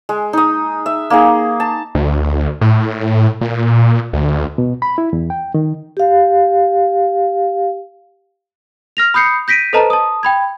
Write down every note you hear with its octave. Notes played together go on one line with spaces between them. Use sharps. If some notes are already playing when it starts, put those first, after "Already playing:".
G#3
D#4 D#6
E5
A#3 D#4 G#4
A5
D2
A2
A#2
D2
B2
B5
E4
E2
G5
D#3
G4 F5
F6 A#6 F7
B5 D#6 G6 C7 C#7
G6 A#6 B6 D7 D#7
A4 B4 C5 D#5 A5 A#5
A5 D#6
G5 B5 G#6